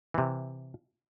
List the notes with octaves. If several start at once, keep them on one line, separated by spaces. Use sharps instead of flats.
C3 E3